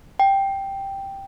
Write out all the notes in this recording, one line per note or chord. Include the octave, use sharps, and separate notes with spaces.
G5